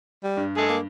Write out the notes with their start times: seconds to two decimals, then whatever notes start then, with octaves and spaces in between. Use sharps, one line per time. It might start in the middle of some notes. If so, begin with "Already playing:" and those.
0.23 G3
0.37 G2
0.57 G#3 A3 G#4 A4
0.69 A#3